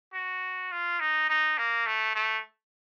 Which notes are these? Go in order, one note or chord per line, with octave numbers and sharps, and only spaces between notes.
F#4
F4
D#4
D#4
A#3
A3
A3